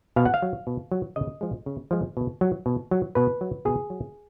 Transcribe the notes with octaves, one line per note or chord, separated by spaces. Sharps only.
B2 F5
F#5
F5
F#3
B2
F#3
C#3 D#5
F3 G#3
C#3
F3 G#3
B2
F#3
B2
F#3
B2 B4
F#3
B2 G#4
F#3